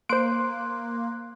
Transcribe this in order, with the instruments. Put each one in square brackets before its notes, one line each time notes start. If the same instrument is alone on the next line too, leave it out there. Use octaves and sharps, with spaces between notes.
[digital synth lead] A#3 [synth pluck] C5 D7 [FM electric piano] C6 F#6